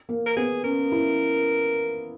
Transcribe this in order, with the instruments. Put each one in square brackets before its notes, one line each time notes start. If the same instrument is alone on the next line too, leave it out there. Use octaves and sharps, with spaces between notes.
[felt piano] A#3
[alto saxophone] A#4
[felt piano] B3 [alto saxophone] G#4
[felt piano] C#4 [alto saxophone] A#4
[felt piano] E4